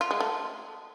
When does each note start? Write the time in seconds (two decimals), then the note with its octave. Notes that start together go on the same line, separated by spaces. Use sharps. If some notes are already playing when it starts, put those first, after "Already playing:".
0.01 F4
0.11 G#3
0.20 A3